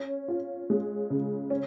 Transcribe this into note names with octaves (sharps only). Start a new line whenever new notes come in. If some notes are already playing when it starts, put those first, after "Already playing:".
Already playing: C#4
F4
G#3
C#3
C#4